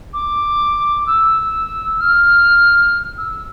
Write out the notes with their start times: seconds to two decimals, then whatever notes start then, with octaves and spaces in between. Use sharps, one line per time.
0.13 D6
1.07 E6
2.01 F6
3.18 E6